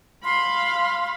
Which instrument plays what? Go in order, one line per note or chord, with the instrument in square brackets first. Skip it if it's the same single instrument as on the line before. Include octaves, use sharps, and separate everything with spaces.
[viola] F5 B5 [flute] C6